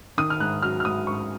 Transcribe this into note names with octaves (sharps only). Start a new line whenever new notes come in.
D#3 D#6
F6
G#2 F#6
F#3 F6
F6
G#2 D#6
G#2 C#6